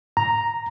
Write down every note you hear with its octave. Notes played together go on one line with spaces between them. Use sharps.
A#5